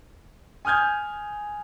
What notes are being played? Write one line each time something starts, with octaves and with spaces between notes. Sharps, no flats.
G#5 D#6 F6 G6 G#6